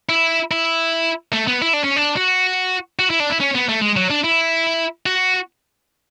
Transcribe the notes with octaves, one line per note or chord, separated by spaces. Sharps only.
E4
E4
A3
B3
E4
D4
C#4
D4
F#4
F#4
E4
D4
E4
C#4
B3
A3
G#3
F#3
D4
E4
F#4